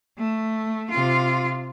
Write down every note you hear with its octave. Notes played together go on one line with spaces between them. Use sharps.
A3
C3 F4